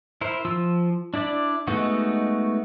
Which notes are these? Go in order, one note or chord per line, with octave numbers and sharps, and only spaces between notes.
E4 A#4 C5
F3 F4 E6
D4 E4 D5
G#3 A3 B3 D#4 F#4